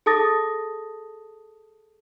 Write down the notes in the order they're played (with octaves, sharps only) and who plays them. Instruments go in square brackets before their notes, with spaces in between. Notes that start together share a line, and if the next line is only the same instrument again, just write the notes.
[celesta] G#4 A4 A5 D#6 A6 A#6